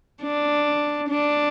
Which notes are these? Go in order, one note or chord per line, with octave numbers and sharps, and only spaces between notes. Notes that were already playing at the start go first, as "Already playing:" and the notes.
D4
D4